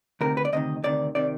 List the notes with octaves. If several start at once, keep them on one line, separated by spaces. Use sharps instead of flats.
D2 C3 D#3 A#4
B4
D5
D2 C3 D#3 D#5
D2 C3 D#3 D5
C3 D#3 D5